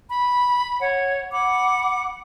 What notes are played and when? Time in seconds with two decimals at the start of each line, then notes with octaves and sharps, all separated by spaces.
0.08 B5
0.81 C#5 F#5
1.32 F#5 B5 D6